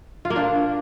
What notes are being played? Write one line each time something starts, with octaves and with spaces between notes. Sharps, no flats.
F4
A#3
D4